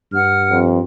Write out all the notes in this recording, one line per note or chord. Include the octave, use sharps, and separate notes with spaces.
G2 F#5 F6
F2